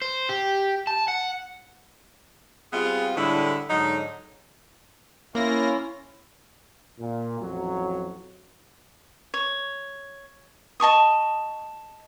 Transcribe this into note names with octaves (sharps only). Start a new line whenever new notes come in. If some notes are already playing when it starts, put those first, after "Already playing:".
C5
G4
A5
F#5
G3 B3 C4 F4 G#4
A2 D3 G3 G#3 E4
G#2 D3 F#3 D#4
A#3 C#4 E4 F4 A#6
A#2
A1 F2 F#3
C#5
D#5 A5 C#6 D#6